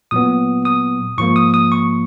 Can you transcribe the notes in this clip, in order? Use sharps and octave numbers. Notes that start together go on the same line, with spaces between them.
A#2 F#3 B3 D#6
D#6
G#2 F3 A#3 C#6
D#6
D#6
C#6